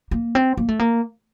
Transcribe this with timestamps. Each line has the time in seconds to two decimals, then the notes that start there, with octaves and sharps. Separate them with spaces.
0.11 A#3
0.35 C4
0.57 A#3
0.69 A3
0.79 A#3